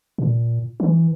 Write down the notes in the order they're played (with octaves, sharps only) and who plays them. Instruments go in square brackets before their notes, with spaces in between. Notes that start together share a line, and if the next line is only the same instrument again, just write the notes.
[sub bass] A#2
E3